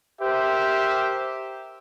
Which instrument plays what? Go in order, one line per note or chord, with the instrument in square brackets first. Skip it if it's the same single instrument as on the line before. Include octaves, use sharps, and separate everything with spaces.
[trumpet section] G4 A#4 C5 E5